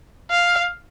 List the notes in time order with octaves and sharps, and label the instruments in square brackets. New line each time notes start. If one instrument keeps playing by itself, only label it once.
[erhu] F5